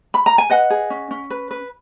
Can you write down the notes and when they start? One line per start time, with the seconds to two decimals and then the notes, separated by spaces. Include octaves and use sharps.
0.14 B5
0.26 A#5
0.38 G#5
0.50 B4 D#5 F#5
0.70 G#4
0.90 C#4
1.11 C#4
1.30 B4
1.51 B4